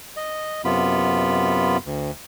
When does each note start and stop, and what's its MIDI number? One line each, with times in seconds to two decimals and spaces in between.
0.17 0.62 75
0.65 1.77 42
0.65 1.77 48
0.65 1.77 59
0.65 1.77 65
0.65 1.77 83
1.86 2.11 38